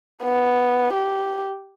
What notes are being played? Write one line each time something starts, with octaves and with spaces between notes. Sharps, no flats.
B3
G4